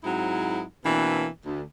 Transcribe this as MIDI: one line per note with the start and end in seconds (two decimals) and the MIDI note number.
0.03 0.62 44
0.03 0.62 54
0.03 0.62 60
0.03 0.62 63
0.03 0.62 64
0.84 1.27 47
0.84 1.27 52
0.84 1.27 58
0.84 1.27 60
0.84 1.27 62
1.45 1.61 38